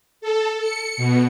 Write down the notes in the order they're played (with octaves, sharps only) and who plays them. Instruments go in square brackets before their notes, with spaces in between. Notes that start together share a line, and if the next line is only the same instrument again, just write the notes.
[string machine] A4
C#7
B2